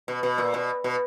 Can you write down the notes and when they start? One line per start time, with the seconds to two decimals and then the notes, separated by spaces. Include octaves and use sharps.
0.08 B2
0.23 B2
0.38 A#2
0.54 B2
0.84 B2